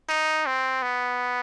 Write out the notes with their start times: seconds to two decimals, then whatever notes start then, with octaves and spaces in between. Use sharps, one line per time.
0.09 D#4
0.46 C4
0.83 B3